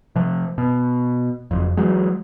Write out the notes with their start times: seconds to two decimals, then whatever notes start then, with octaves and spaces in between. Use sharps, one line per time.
0.16 C3 F3
0.58 B2
1.51 F#1 F2
1.77 E3 F#3 G#3